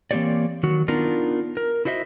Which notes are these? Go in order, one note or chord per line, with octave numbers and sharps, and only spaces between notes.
E3 A#3 C4 G4 C#5 D5
D#3 F#3 F#4
B3 D4 D#4 F4 A#4
A#4
E4 F#4 C5 D#5 E5